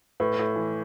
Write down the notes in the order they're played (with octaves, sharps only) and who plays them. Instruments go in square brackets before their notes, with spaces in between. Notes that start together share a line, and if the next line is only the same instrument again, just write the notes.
[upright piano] A2 [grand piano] B4
[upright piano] A2
E3